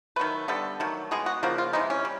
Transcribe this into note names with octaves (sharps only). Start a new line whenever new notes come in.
D#3 F#3 A3 B4
D3 G3 B3 A4
D#3 F#3 A3
B2 G#3 B3 G#4
F#4
C#3 F3 A#3 F#4
F4
C3 E3 G#3 D#4
C#4
G3